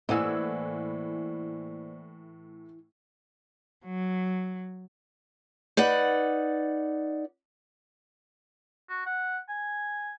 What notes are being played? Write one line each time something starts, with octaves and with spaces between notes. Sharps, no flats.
A2 E3 A#3 C5 D5 D#5 F#5 E6
F#3
D#4 B4 D5 F#5
F#4
F#5
G#5